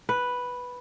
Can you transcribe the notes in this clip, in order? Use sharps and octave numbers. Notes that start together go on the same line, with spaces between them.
B4